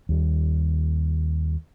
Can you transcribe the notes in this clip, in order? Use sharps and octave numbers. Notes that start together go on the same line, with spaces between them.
D#2 G3